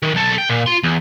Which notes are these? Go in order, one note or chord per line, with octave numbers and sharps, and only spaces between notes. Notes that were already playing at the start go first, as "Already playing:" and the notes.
D#3
B1 A4
G5
A#2
F4 C6
E2